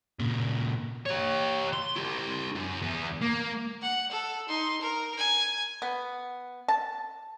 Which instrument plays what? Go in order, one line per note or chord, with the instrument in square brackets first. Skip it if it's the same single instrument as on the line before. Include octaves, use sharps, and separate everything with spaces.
[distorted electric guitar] A#2 C#3
G4 C#5
C6
E4 G4
F#2
E2 B3
A#3
[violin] F#5
A4
D#4 C6
A#4
G#5
[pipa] B3
A5